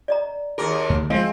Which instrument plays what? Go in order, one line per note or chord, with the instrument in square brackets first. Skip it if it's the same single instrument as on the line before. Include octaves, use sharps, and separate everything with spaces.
[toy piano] D5 D#5 A#5
[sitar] D#2 A#4 [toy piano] F#4 G#4
[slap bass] D2
[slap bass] E3 F3 [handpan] G#3 [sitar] C4 [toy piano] F5